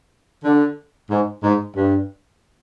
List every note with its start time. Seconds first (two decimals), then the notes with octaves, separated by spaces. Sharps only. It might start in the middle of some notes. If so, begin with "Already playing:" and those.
0.44 D3
1.11 G#2
1.43 G#2
1.76 G2